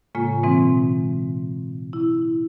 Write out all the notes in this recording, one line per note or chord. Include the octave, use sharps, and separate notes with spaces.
A2 C#3 G#3 A#3 F4 G#5
B2 E3 G#3 C4
E4